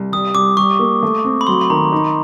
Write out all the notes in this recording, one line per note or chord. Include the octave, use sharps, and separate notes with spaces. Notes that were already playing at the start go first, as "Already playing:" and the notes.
Already playing: C2
G3 D#6
C2 D6
G3 C#6
A#3
A3
C4
B5
F#3 C6
B5
D#3 A#5
D#4